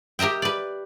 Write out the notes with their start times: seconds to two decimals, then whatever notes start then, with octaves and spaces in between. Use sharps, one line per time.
0.19 G4 A#4 D#5 E5 G5
0.42 B4 D5